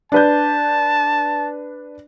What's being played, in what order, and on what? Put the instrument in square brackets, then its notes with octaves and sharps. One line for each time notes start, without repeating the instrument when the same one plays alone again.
[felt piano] D4 B4 G6 [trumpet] A5